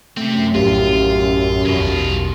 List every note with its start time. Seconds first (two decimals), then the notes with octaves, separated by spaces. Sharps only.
0.17 F#2 C3 A3 C4
0.55 A#1 A2 F4 G4
1.66 A#1 E2 B2 D#3 F4